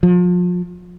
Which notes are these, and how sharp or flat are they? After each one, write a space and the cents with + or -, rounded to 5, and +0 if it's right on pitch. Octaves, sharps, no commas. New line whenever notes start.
F3 +35